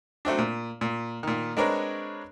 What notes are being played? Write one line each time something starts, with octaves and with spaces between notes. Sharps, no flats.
F#3 A3 C4 D4
A#2
A#2
A#2 D#3
G#3 C4 D4 A#4 B4 C#5